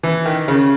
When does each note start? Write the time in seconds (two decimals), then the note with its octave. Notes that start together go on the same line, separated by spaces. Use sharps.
0.03 E3
0.26 D#3
0.48 C#3